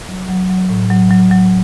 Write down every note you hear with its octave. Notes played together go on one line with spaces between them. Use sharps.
F#3
F#3
F#3
A2
F#3
F#3
F#3